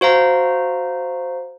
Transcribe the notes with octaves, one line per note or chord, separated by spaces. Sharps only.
F#4 C5 F5 A#5